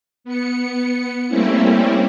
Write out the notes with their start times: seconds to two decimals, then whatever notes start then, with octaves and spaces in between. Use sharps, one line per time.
0.24 B3 C#7
1.28 G3 A3 A#3 C4 C#4 E4